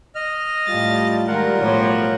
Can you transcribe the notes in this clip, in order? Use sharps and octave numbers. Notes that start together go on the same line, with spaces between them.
D#5 F6
A2 G3 F4 A5 A6
D#3 G3 G#3 F4 A#4 F#5
B1 A2 F3 G3 C5 C#5